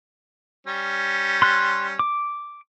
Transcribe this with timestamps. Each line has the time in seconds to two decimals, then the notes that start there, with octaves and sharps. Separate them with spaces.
0.67 G3 C#4
1.42 C6 F#6
1.99 D6